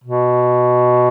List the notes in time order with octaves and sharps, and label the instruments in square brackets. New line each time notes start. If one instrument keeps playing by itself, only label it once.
[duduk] B2